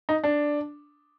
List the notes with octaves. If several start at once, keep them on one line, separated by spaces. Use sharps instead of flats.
D#4
D4